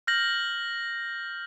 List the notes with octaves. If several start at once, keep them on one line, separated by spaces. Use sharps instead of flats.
F6 G6 A#6 F#7